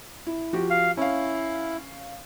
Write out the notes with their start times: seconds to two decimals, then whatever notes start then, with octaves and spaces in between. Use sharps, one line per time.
0.27 E4
0.53 F3 F#4 G4
0.70 F5
0.97 C#4 E4 F5